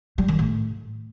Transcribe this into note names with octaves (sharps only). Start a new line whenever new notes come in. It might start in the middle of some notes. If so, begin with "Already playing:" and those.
G3
D#3
A2